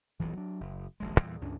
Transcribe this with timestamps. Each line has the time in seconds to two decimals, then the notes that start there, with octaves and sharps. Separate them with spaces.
0.20 D#1 B1 G2 E3
0.33 F#3 D4
0.61 F#1
1.00 D#1 A#1 G#3
1.18 E2 A#2 E3 G3
1.41 C#2 G2 C#4 D4